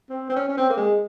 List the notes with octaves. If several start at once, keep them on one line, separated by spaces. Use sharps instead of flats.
C4
C4
C#4
C#4
C4
A#3
G#3